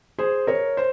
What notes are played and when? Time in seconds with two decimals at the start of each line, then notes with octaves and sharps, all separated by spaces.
0.18 G#4 C5
0.47 A#4 C#5
0.77 C5